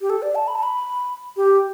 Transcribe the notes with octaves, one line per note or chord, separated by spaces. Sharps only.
G4
A4
D5
A5
B5
A5
B5
G4